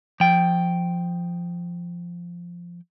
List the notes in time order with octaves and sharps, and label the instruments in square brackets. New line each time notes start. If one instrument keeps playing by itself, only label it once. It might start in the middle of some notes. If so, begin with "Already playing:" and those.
[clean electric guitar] F3 G5